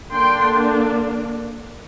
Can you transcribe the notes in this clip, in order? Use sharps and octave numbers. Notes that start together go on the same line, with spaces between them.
D3 A#3 D4 G5 C6